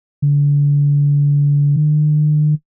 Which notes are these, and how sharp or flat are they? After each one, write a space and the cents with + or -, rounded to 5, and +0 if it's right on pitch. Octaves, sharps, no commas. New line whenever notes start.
D3 -35
D3 +45